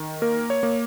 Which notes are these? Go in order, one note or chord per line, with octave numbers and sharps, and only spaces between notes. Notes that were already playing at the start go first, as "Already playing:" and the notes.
Already playing: D#3
A#3 A#4
C#5
A#3